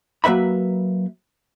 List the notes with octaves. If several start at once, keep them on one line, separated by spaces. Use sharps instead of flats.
F#3 A#3 B4 E5 B5